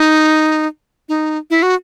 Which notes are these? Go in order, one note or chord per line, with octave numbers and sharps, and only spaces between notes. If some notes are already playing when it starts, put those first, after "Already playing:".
Already playing: D#4
D#4
E4
F#4